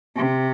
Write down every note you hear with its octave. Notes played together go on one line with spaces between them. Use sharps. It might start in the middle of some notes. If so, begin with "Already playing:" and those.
C3